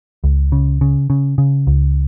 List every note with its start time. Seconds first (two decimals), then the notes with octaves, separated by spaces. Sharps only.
0.24 C#2
0.52 C#3
0.81 C#3
1.10 C#3
1.38 C#3
1.67 C#2